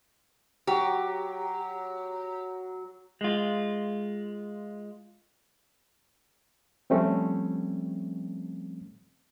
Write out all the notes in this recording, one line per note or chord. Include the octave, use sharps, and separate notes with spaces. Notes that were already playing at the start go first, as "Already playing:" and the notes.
F#3 G4
G#3 F4
F3 G3 A3 C4 C#4